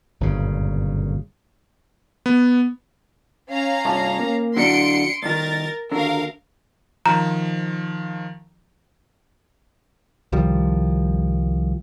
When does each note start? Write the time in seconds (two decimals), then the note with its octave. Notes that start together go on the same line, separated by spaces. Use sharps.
0.20 G1 F#2 A#2 C#3
2.26 B3
3.50 C#4 F5 A#5
3.85 G2 C3 A5
4.19 A#3
4.57 D3 F#3 D4 C6 C#7 D7
5.23 C2 D#3 A#4 A6
5.91 D#2 D3 A#4 F5
7.06 D#3 F3 A#5
10.32 C2 D#3 F3 G3